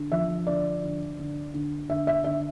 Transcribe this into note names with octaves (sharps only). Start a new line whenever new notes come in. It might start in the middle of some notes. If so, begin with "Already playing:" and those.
Already playing: D3
F3 E5
D3 D5
D3
D3
D3
D3 E5
E5
D3 E5